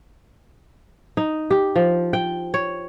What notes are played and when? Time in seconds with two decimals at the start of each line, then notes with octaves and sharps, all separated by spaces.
1.17 D#4
1.51 G4
1.76 F3
2.13 G5
2.54 C#5